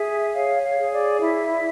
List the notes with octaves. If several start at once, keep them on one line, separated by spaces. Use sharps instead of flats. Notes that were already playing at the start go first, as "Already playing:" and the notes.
Already playing: G#4 E5
C#5 F5
F5
G#4
D5
E4 E5